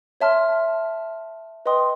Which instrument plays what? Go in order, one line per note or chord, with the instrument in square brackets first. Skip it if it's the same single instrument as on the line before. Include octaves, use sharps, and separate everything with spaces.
[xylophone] C#5 E5 A5 C6 F6
B4 D#5 G5 C6 D#6